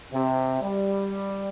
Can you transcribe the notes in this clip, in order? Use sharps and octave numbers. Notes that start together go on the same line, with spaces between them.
C3
G3